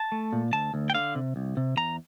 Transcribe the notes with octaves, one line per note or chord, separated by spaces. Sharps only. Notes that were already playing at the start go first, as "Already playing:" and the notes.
Already playing: A5
A3
A#2
D2 A5
D2
G5
D3 F5
C3
C2
C3
E2 A#5